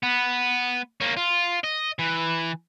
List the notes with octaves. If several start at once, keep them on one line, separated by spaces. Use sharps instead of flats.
B3
A#3 C#4
F4
D#5
E3